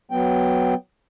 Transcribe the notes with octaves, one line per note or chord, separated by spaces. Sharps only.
F#3 B3 G5